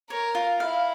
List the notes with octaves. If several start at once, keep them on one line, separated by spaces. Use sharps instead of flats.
A#4 C#5
F4
E4 F5